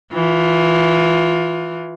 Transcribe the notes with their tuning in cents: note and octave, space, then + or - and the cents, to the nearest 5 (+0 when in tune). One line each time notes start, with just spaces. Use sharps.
E3 +0 F4 +20